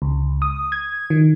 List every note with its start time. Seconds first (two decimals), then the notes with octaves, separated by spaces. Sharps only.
0.02 C#2
0.42 D#6
0.72 G#6
1.10 D#3